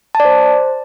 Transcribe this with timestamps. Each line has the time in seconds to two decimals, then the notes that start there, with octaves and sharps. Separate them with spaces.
0.15 A5
0.20 D5
0.25 C5